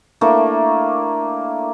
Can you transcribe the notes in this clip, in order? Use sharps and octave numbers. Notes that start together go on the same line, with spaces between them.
A3 A#3 D4 E4